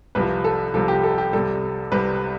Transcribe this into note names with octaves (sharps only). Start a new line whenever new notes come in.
C2 C3 F3 B4
A4
C2 C3 F3 A4
G4
A4
G4
C2 C3 G3 A4
C2 C3 G3 B4